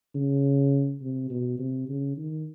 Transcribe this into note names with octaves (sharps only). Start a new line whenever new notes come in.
C#3
C3
B2
C3
C#3
D#3